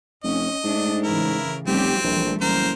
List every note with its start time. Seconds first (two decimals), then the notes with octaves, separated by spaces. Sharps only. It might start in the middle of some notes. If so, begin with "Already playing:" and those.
0.24 F1 C#4 D#5
0.64 G#2 A3 D4
1.04 A2 C#3 E3 E4 A#4
1.67 F1 G3 C4 C#4 G4
2.04 A#1 E3 G3 A3
2.41 F#1 A#4 C5